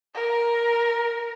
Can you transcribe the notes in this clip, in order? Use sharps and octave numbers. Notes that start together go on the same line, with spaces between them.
A#4